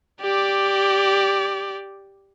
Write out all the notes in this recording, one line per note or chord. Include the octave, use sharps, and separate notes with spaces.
G4 D5